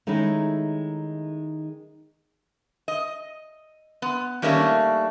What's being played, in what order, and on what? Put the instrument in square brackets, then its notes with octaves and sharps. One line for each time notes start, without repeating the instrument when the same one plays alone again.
[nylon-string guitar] D#3 G#3 A3 C#4 D#4 E4
[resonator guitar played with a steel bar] D#5
B3
D#3 G3 A3 A#3 C#4 D4